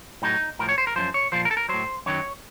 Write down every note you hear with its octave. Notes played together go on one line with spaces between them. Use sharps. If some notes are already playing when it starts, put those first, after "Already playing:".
A2 F#3 D#4
A2 F3 A#4
C#5
C5
A#4
F#2 F3 C5
C#5
A#2 F3 C5
A#4
A4
A#4
A2 F#3 C5
F#2 D#3 F#3 C#5